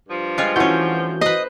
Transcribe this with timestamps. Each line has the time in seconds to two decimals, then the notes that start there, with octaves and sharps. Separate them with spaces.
0.09 G2 F3
0.38 G3 G#3 F4
0.56 E3 A3 C#4 F#4 G6
1.21 B4 C5 D#5